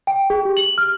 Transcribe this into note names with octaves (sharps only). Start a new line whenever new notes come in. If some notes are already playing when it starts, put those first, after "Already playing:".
G5
G#4
G4
F#7
F6